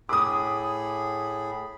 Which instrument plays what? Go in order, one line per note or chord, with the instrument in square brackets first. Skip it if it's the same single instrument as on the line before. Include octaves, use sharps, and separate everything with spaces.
[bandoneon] A2 G#4 B5 [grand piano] D6 D#6